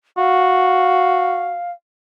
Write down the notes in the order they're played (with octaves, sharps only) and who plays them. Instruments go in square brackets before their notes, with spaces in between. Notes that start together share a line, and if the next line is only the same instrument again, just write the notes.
[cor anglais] F#4 [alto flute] F5